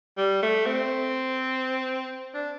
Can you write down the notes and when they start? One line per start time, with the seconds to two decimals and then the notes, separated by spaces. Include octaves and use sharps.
0.17 G3
0.43 A3
0.66 C4
2.34 D4